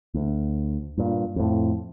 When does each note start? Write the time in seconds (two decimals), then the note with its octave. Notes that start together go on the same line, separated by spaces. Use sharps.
0.14 D2
0.98 G2 A#2
1.36 F2 A2